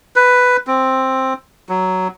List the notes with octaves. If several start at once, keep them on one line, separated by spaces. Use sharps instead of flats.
B4
C4
F#3